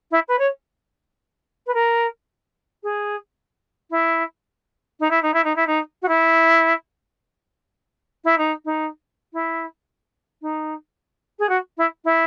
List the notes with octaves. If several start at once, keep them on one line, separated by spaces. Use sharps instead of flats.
E4
B4
C#5
B4
A#4
G#4
E4
D#4
E4
D#4
E4
D#4
E4
D#4
F#4
E4
E4
D#4
D#4
E4
D#4
G#4
F#4
E4
E4